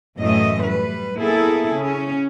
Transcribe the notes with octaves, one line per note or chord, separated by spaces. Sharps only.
F#2 A2 E3 F#3 A3 D#5
G3 B4
A#3 B3 E4 G#4 A4
C#3 C#4